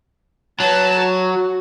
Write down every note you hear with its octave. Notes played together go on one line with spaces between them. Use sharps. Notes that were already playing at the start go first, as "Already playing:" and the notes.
F#3 B4 A5
F#4